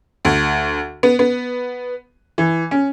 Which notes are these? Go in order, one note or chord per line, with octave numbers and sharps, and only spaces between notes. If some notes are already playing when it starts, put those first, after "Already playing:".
D2
B3
B3
E3
C#4